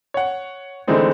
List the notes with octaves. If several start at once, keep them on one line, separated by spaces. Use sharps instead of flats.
C#5 F#5
D3 E3 G#3 A3 C4 D#4